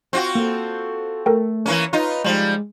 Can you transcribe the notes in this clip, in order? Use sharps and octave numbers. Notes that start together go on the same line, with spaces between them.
C4 F4 F#4
A#3 A4
A3 A4 A#4 G5
E3 A#3 C#4
D#4 F4 B4
F3 G3 G#3